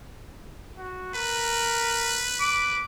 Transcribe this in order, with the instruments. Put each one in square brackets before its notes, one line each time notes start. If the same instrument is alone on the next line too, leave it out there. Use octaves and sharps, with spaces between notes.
[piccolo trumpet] F#4
[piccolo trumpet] A#4 [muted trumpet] B4
[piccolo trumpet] D6